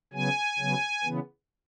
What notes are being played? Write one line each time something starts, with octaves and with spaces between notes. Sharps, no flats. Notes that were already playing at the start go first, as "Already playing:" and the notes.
C#3 F#3 B3 G#5
C#3 F#3 B3
C#3 E3 B3